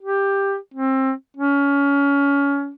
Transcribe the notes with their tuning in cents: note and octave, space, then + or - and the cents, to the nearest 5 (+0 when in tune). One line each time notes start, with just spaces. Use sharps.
G4 +10
C4 +25
C#4 +25